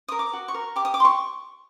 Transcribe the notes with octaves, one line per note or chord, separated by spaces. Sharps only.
A#4 D#6
D6
F#4
C#6
A#4
G4 D6
D#6
D6
G4 C6
C#6